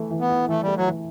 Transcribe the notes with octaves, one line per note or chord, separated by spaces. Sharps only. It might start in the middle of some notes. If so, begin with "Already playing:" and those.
Already playing: E3 A3
E3
B3
E4
E3 A3
G3 A3
F#3
E3